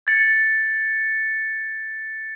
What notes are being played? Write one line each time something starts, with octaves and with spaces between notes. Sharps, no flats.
G#6 A6 C#7